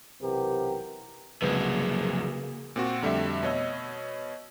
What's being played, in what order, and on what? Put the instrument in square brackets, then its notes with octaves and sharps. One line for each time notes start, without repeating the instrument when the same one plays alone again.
[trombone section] B1 C3 E3 B3 G4 A#4
[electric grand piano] C2 G#3 [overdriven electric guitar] F2 F#3 [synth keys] C#3 B4 [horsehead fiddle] A#3 G#4
[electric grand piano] A#2 C4 F#4
F2 D3 G3 A3 E5
B2 C#5 D#5 E6